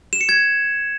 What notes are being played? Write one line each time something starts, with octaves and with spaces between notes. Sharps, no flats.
E7
C#7
G#6